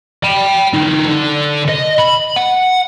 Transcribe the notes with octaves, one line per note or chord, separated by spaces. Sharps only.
G5 B5
D3 D#4
D3
D#5
B5
F#5